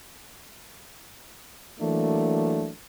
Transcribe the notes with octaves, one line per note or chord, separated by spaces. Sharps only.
E3 F#3 A3 A#3 D4